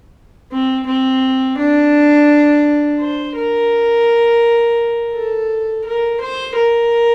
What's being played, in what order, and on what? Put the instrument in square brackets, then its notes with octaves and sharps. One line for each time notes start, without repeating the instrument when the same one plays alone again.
[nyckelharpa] C4
C4
D4
C5
A#4
A4
A#4
C5
A#4